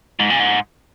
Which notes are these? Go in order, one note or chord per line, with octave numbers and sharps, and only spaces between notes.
G#2
A#2
G#2